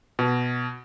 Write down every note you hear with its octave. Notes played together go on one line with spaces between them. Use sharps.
B2